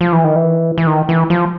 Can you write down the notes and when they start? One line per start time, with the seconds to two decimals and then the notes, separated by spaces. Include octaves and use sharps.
0.01 F3
0.12 E3
0.24 D#3
0.36 E3
0.78 E3
0.87 D#3
1.09 E3
1.30 F3